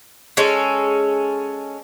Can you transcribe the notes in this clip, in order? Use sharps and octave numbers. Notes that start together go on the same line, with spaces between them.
G#3 C#4 A4